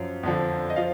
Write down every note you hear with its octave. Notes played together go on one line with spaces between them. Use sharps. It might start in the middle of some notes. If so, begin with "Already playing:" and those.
Already playing: F#2 F3
F2 D3 F3
D#5
F3 F5